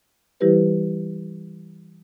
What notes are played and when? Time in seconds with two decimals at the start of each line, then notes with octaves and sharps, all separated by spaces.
0.40 E3 G3 E4 G4 B4 C5